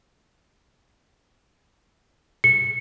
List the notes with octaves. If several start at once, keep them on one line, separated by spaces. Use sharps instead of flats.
C#7